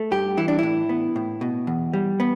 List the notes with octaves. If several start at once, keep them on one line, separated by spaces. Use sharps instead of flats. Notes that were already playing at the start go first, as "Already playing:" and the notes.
Already playing: A3
G2 G4
E3 E4
D4
A2 E4
B3
A2
B2
E2
G3
B3